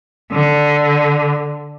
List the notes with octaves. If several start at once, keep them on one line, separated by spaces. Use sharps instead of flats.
D3